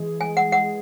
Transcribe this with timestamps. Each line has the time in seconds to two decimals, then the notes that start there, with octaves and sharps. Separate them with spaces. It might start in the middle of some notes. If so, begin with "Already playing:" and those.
Already playing: E3 G#3 G#4
0.21 G#5
0.37 F#5
0.52 F#5